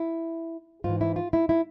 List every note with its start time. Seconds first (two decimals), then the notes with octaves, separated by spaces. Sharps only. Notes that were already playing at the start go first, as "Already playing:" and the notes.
Already playing: E4
0.84 G#2 F4
0.89 E3
1.01 E4
1.16 F4
1.33 E4
1.49 E4